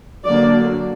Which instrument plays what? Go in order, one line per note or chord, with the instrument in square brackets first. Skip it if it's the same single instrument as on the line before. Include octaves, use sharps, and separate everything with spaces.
[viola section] D3 F#3 A#3 D4 D5